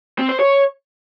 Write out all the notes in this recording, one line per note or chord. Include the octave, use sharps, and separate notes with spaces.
C4
C5
C#5